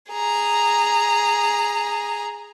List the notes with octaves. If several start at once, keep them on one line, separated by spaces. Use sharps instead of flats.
G#4 A#5